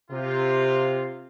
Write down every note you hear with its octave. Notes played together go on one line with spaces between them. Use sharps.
C3 F4